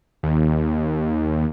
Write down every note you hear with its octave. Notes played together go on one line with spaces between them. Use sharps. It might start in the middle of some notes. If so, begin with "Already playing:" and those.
D#2